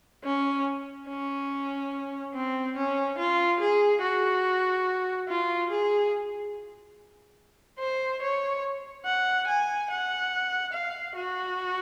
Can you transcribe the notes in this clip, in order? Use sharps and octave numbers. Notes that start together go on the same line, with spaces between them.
C#4
C#4
C4
C#4
F4
G#4
F#4
F4
G#4
C5
C#5
F#5
G#5
F#5
F5
F#4